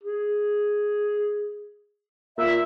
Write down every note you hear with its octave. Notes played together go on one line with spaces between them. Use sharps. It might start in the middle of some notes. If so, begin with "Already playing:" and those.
G#4
A#2 E5